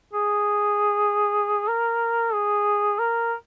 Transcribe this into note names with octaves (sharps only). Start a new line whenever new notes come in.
G#4
A#4
G#4
A#4